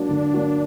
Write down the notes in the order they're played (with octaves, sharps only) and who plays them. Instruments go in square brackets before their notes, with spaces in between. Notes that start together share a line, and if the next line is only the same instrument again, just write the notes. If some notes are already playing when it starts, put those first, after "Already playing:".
Already playing: [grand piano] F#3 A#3 F#4 [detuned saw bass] D4
[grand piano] D3
F#3 A#3 F#4